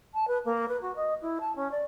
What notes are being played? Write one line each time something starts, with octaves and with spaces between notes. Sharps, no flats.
A5
B4
A#3
B4
F#4
D#5
E4
A5
C#4
D5